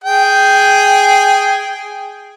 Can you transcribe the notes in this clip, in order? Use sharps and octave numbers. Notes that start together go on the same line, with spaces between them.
G#4 G5